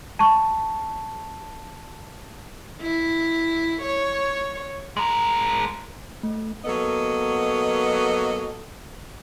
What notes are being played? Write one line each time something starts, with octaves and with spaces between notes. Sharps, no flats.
A5 C#6
E4
C#5
G#3 A#4
A3
F#3 A#3 B3 A4 D#5